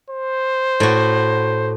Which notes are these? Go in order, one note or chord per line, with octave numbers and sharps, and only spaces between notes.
C5
A2 F#4